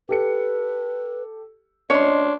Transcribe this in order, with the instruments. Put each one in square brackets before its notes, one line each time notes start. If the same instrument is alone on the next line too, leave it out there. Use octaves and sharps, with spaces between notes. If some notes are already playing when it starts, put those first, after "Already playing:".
[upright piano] G4 A4 C#7 [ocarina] B4
[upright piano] C#4 [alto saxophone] D4 [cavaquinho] C#5 C6 [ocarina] D#5